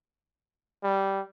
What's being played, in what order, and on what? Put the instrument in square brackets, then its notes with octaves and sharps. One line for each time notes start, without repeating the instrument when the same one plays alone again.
[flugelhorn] G3